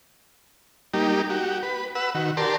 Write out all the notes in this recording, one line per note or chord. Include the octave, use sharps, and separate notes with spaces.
G3 A#3 D#4 G4
F#4 G4
B4
B4 F#5 E6
D#3 F#4
G4 A#4 D5 A5 C6